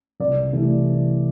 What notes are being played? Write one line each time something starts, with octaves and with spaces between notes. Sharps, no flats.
C2 D5
C3 E3 A3